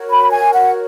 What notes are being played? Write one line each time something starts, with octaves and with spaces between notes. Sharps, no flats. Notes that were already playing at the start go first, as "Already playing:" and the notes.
Already playing: F#4 A#4 C#5
B5
G#5
F#5